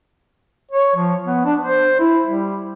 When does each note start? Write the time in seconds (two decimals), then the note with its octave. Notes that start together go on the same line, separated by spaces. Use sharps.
0.71 C#5
0.96 F3
1.25 B3
1.45 D4
1.60 C5
2.00 E4
2.25 G3